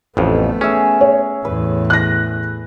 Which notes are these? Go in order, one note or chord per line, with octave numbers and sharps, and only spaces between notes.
A1 F2 A3 B3
C#4 G#4 E5
C#5
E2 A2 B4
F#6 A#6